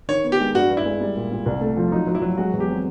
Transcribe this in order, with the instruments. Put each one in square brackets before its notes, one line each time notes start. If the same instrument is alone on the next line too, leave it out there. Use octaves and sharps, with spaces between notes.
[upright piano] D#3 [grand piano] C#5
[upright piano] B3
[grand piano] G4
[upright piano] G#3
[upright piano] G2 [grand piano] F#4
[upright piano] G2
[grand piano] E4
[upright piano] G#3
G3
A#2
A#2
C2
A3
F3
[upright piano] F#3 [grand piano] D#4
[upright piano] F#3
[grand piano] E4
[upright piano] F#3
[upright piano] G#3 [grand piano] F#4
[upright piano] E2
[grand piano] G4
[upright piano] C4